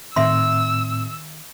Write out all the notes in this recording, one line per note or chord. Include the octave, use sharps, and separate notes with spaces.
A2 D#3 C4 E5 C6 E6